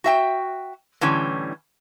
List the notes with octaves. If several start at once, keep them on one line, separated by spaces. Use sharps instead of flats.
F#4 E5 G5
A2 D3 E3 G3 C#4